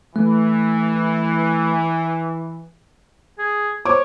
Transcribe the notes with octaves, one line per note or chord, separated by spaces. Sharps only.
E3 A3
G#4
C5 C#5 D6